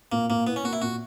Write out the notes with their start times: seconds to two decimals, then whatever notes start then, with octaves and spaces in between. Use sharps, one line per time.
0.12 A#2 A#3
0.30 A#2 A#3
0.46 B3 E4
0.56 C#4
0.64 A#3 F#4
0.73 E4
0.82 A#2 F#4